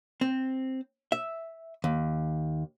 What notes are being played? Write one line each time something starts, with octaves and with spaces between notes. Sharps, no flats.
C4
E5
D#2